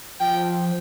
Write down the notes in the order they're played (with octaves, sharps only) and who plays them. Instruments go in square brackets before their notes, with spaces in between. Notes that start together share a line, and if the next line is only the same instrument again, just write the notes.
[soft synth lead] F3 [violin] G5